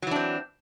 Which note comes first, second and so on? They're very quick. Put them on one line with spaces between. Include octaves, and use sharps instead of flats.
F#3 E3 D4 C4